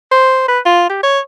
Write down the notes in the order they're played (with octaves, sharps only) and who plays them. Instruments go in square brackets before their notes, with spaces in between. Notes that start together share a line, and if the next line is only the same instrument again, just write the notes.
[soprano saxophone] C5
B4
F4
G4
C#5